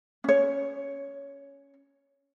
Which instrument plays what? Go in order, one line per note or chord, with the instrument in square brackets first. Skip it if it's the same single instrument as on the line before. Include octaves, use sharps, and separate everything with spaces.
[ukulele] C#4 C#5